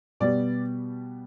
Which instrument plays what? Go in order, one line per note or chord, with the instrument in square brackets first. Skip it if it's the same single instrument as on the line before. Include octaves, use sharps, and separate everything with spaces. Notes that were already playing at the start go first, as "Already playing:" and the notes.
[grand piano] B2 G3 B3 D5